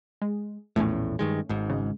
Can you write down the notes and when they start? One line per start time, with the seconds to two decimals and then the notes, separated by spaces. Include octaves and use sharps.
0.22 G#3
0.76 A#1 E2 A2 A3 C#4
1.19 G2 D#3 G#3
1.49 G#1 G#2
1.69 C#3 G#3